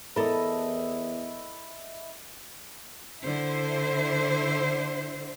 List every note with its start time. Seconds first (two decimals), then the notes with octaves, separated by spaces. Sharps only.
0.16 E2 E4 A4 A#4 D#5
3.24 D3 E4 C5